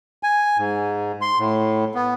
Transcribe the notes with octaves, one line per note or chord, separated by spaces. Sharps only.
G#5
G#2
C6
A2
B3